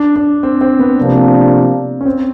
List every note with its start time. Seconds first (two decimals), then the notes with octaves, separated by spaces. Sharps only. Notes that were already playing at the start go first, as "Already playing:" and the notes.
Already playing: D4
0.16 D4
0.43 C4
0.61 C4
0.79 B3
0.97 C3 F3 A#3 D4
2.01 C#4
2.06 C4